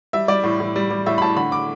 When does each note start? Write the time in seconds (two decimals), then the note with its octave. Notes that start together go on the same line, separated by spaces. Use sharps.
0.13 G3 E5
0.28 G3 D5
0.44 A2
0.60 A2
0.76 G3
0.91 G3
1.06 A2 E5
1.18 B5
1.22 A2 A5
1.36 D3 B5
1.52 D6